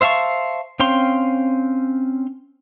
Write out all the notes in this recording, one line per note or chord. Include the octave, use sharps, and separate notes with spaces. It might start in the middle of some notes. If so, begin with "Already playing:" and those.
C5 E5 F5 A5 C#6
C4 C#4 F5 G5 C6